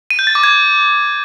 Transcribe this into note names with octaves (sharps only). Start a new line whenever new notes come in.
D#7
G6
A6
D6
G#6